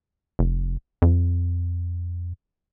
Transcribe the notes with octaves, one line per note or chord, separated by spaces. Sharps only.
F1
F2